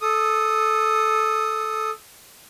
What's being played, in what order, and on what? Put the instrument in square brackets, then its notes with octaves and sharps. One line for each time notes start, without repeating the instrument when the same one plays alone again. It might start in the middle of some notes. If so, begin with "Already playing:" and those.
[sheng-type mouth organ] A4 D#6